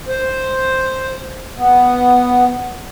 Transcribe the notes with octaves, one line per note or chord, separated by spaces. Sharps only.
C5
B3